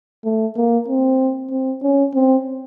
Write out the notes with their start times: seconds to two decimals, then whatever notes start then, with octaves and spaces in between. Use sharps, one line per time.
0.25 A3
0.57 A#3
0.88 C4
1.50 C4
1.82 C#4
2.14 C4